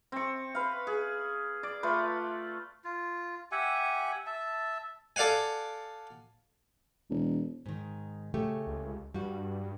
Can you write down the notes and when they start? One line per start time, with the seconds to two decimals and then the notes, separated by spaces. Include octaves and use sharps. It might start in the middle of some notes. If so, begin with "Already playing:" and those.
0.12 C4 C#6
0.55 B4 F5
0.87 G#4
1.63 D5
1.83 A3 F4 B4
2.84 F4
3.52 G4 E5 F#5 G#5
4.26 E5 A5
5.16 A4 D5 F5 F#5 G#5
7.10 E1
7.66 G#2 D#3
8.34 C#3 A3 G4
8.67 C#2
9.14 G2 G3 F#4